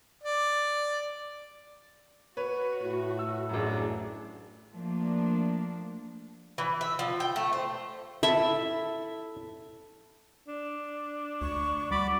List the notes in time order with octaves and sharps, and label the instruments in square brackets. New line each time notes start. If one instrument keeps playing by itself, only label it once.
[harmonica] D5
[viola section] F#4 [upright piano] B4 C#5
[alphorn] A2
[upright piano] E6
[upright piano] A1 F#2 [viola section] D4 G#4
[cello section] F3 A3 A#3 D4
[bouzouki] E3
E5
F3
G5
A3
C5
[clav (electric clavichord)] E4 A4 [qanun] E5
[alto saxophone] D4
[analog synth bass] D2 [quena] C#6
[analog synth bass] G3 [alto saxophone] F#4 [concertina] D5 B5 D6